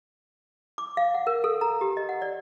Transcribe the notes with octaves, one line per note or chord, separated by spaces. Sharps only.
D6
F5
F#5
A#4
A4
A#5
G4
D#5
F#5
D5